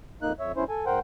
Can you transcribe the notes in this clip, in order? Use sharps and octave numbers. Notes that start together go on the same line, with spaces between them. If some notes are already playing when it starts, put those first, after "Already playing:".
F2 A#3 D#4 F#6
F2 C#5 E5
E2 G2 C#4 E4 C5
A4 G#5
G#2 A#4 C5 F#5 G5